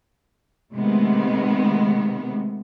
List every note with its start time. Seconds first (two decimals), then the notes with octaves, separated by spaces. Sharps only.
0.74 C3 D#3 G#3 A3 B3